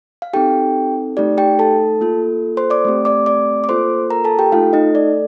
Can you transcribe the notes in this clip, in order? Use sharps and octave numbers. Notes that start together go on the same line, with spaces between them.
F5
C4 D#4 G4 A4 G5
A3 D#4 G4 D5
G4 G5
A4 A5
A#3 F4 A4
C5 C6
D5 D6
A3 C4 G4
D5 D6
D5 D6
D6
A#3 F4 A4 C5 C6
A#4 A#5
A4 A5
G4 G5
A3 D#4 F4 A4 F5
D#4 D#5
D5